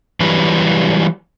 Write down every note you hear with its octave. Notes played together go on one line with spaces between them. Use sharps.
E3 F#3 G3 B4